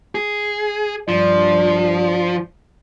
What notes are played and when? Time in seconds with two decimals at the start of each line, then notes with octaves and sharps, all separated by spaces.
0.15 G#4
1.08 G2 F3 D5